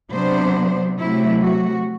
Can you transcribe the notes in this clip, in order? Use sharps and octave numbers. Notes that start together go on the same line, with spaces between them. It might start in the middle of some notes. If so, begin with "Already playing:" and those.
C3 F#3 B3 D4 C5
C3 F#3 A3 E4
F#4